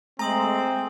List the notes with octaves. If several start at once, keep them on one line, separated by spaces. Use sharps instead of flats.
G#3 A3 C4 G#5 A#5 D#6 F#7